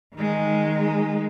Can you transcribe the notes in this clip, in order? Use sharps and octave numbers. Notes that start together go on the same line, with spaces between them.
D#3 G#3